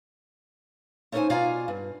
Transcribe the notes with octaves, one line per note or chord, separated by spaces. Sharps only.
A3 C#4 D#4 E4 C5 G#5
B2 F4 D5 F5 G#5 A#5
G2